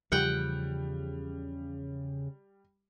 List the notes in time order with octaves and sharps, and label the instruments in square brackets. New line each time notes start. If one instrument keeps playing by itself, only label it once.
[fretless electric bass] E2 F3 [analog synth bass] C#3 [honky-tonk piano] G3 [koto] F#5 G5